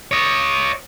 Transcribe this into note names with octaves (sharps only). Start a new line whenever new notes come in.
C#5 D#5